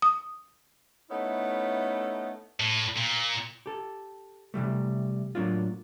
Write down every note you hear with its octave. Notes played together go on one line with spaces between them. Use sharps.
D#6
A3 B3 C#4 D#4 E4 A4
A2
A#2
G4 A4
C3 E3 G3 A3
A2 F#3 A#3 D4 F4